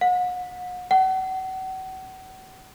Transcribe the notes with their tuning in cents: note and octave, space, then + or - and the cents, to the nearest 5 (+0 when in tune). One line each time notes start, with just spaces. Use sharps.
F#5 -40
F#5 +35